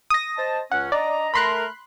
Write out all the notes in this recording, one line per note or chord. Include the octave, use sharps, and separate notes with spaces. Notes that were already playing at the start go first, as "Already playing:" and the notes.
D#6 A#6
C5 D#5 A5
C#2 C#4 F#5
D4 D5 D#5 A#5
A3 A#4 B5 C6 F#6